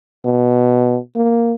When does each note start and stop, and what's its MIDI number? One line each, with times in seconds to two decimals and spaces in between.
0.25 0.98 47
1.15 1.55 58